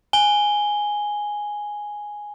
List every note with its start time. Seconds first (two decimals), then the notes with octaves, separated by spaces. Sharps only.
0.13 G#5 G7